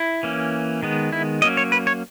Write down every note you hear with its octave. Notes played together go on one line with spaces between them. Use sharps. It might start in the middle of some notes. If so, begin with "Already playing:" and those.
Already playing: E4
E3 A#3 C#4
D#3 G#3 B3
E4
F#3 A#3 C#4 D#5
C#5
B4
C#5